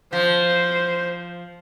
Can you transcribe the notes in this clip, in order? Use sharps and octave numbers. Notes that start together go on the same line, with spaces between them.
F3 C5